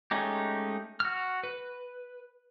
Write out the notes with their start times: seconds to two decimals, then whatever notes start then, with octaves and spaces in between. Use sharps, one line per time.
0.11 G#3 A3 C#4 D#4 G4
1.00 F#4 F6
1.43 B4